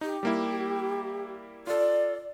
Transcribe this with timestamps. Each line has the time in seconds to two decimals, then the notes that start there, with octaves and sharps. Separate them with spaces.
0.01 D#4 G4
0.23 G3 A#3 E4
1.67 F4 A4 D5